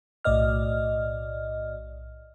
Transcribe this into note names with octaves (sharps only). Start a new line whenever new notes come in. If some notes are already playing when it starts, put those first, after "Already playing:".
B1 A2 D5 D#5 F6